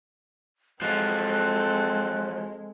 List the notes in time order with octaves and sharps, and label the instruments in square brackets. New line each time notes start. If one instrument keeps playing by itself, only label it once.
[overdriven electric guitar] F3 F#3 [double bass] G#3 [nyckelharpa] C4 A4 [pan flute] F#6